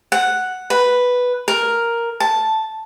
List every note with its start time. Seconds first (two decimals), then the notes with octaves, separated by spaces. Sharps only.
0.12 F#5
0.70 B4
1.48 A#4
2.20 A5